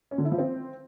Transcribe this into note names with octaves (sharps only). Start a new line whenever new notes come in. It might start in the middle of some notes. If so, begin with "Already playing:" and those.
C#4
D3
E4
F3
C4